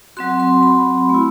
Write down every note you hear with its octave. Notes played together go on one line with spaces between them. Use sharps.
F#3 C4 F#4 C6
C6
B5
A3 E4